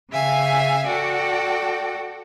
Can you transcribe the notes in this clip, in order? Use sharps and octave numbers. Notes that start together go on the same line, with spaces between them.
C#3 E5 F5 G#5
F#4 A4 D5 F#5 G5